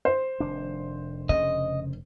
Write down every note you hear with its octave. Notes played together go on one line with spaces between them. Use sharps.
C5
F1 D#3 D4
C#3 D#5